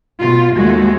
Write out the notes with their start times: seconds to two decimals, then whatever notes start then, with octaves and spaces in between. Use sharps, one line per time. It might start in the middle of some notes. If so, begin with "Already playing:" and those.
0.19 B2 F4
0.56 D#2 G#3 A3 F#4